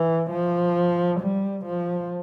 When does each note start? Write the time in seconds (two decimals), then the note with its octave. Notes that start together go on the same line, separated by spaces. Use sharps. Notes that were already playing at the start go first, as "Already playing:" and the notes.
Already playing: E3
0.31 F3
1.20 G3
1.65 F3